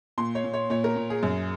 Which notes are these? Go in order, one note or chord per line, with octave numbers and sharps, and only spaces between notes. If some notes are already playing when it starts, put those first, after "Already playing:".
A#2 C6
C#5
A#2
C#5
A#2 C#5
A#4
A#2
G#4
F#2